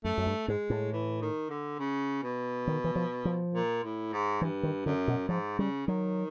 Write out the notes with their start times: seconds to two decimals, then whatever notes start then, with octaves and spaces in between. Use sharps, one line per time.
0.04 F#2 A3
0.18 F#2
0.27 G2
0.48 G#2 G#3
0.70 A2
0.92 E3
1.22 D#3
1.50 D3
1.79 C#3
2.23 B2
2.67 D#3
2.84 E3
2.96 F3
3.25 F3
3.54 A#2
3.84 A2
4.13 G#2
4.41 G2 E3
4.63 D#3
4.85 F#2 D3
5.08 B2
5.28 G#2 F3
5.59 C#3 G3
5.87 D#3 F#3